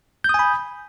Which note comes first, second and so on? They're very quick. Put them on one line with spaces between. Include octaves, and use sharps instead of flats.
G6 D#6 G#5 B5